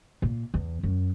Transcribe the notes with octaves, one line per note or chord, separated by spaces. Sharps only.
A#2
E2
F#2